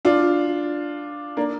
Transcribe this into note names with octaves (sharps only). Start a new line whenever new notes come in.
D4 F4
A#3 D4